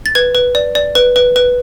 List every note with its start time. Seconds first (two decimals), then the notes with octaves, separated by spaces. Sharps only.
0.06 A6
0.15 B4 G#6
0.35 B4
0.55 D5
0.75 D5
0.95 B4
1.16 B4
1.36 B4